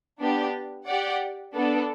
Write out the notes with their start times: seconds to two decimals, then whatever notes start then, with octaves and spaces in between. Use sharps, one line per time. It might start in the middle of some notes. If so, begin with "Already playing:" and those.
0.20 B3 D4 G4
0.87 G4 D5 F#5
1.55 B3 D4 A4